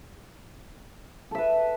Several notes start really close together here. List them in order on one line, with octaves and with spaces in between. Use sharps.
A4 E5 B4